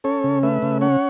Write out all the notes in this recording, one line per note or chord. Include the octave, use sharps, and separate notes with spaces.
C#4 A4 C#5
C#3
A3 B4 E5
C#3
C#4 C#5 F#5